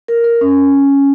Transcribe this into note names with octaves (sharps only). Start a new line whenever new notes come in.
A#4
A#4
C#4